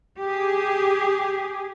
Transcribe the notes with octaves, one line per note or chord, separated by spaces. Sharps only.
G4 G#4